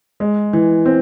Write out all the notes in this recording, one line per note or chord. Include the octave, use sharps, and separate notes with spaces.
G#3
E3
C4